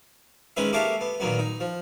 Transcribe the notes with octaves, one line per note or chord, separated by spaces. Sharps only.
D#3 G#3 C#4 B4 E5
A#3 G4 A4 C#5 E5 F5
B3
A#2 D#3 F#3 B3
D#4
F3